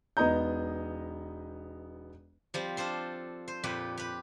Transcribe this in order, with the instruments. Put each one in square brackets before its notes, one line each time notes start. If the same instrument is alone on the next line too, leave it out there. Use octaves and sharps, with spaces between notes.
[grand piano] E1 B3 D#4 D#5 A#5 G6
[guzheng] F3 G3 C4
D4 F4 A4 C5
C5
F2 A#2 G4 B4
G4 B4